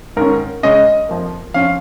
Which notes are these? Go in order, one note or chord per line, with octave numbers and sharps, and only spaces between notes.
G#2 D#3 C#4 A#4
C#3 G#3 C#4 D#5
F2 F3 A#3
F2 F3 C#4 F5